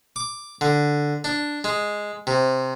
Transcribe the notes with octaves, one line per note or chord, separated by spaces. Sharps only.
D6
D3
D4
G#3
C3